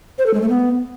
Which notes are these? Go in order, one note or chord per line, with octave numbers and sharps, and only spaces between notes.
C5
A4
G#3
A3
B3